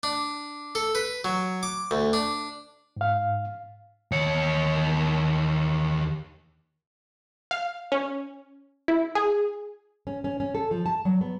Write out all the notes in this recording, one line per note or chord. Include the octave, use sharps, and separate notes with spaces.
D4
A4
B4
F#3
D6
D2
D4
G#2 F5
D#2 C#5
F5
C#4
E4
G#4
C#4
C#4
C#4
A4
F3
A5
F#3
B3